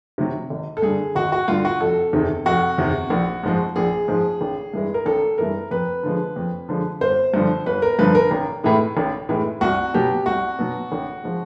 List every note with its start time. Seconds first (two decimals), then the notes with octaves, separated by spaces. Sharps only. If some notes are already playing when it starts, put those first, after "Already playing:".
0.18 C3 D#3 F#3
0.50 G#1
0.77 A4
0.83 G2 D3 G#4
1.15 G#1 F#4
1.32 F#4
1.48 G2 D3 F4
1.65 F#4
1.81 F1 A4
2.13 E2 C3 D#3
2.46 F1 F#4
2.78 E2 C3 D#3
3.10 A#1
3.43 G#2 F3 G#3
3.76 A#1 G#4
4.08 G#2 F3 G#3
4.41 A1
4.74 G2 E3 G#3
4.94 A#4
5.06 A1 A4
5.38 G2 E3 G#3 A#4
5.71 F2 B4
6.03 D3 F3 G#3
6.36 F2
6.69 D3 F3 G#3
7.01 G1 C5
7.34 G2 D3 F3
7.66 G1 B4
7.82 A#4
7.99 G2 D3 F3 B4
8.15 A#4
8.31 A1
8.64 A2 E3 G#3
8.97 A1
9.29 A2 E3 G#3
9.61 C2 F#4
9.94 B2 F#3 G4
10.26 C2 F#4
10.59 B2 F#3
10.92 A1
11.23 F3 G#3